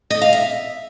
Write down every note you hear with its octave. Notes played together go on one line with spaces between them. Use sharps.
D#5
F5
E5